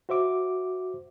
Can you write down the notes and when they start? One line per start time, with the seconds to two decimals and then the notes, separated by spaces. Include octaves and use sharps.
0.09 F#4 C5 E5 D6